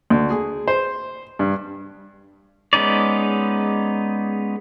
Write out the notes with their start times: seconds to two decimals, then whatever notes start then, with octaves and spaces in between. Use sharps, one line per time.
0.10 D2
0.30 G#4
0.68 C5
1.39 G2
2.73 G#3 B3 C#4 D#4 D5